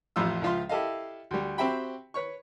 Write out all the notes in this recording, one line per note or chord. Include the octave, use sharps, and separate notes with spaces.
A1 F2 A2 F4 E6
C#2 F3 F4 E5 C6
E4 G4 A4 D#5 F5
D2 G3
C4 F#4 G4 E5 G5 B5
B4 C#5 C#6